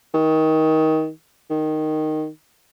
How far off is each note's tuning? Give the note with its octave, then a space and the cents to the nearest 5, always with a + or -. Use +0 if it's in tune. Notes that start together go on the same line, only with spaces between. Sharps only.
D#3 +20
D#3 -5